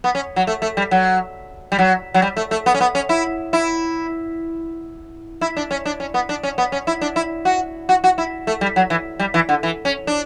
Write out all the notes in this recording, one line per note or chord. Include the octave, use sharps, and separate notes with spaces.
B3
C#4
F#3
A3
A3
G3
F#3
G3
F#3
F#3
G3
A3
A3
B3
C#4
B3
C#4
E4
E4
E4
D4
C#4
D4
C#4
B3
D4
C#4
B3
C#4
E4
D4
E4
F#4
F#4
F#4
E4
A3
G3
F#3
E3
G3
E3
D3
E3
C#4
D4